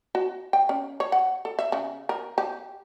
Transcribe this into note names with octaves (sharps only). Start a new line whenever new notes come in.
F#4
G5
C#4
C#5
F#5
A4
E5
C#3
A#4
G4